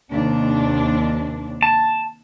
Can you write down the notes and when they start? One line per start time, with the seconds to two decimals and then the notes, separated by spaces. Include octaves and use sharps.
0.11 D#2 C3 D4
1.63 A5